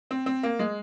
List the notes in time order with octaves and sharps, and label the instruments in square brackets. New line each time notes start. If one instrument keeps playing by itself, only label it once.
[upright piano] C4
C4
A#3
G#3